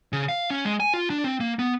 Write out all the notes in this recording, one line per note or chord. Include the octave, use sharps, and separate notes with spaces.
C#3
F5
C#4
G#3
G#5
F4
D4
C4
A#3
B3